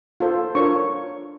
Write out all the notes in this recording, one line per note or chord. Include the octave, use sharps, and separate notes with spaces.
F4 A4 C5
D4 F4 A#4 C#5 C#6